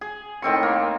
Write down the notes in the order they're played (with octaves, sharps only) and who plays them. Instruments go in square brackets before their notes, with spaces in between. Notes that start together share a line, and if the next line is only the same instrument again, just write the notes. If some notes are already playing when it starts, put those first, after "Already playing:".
[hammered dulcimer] G#4
A2 D#3 C4 C#6
A#3